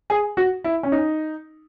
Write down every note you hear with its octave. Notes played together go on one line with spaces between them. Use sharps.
G#4
F#4
E4
C#4
D#4